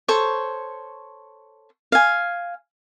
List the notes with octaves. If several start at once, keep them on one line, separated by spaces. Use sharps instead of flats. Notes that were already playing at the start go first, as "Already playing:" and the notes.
A4 C5 C#5 C#6
F5 G#5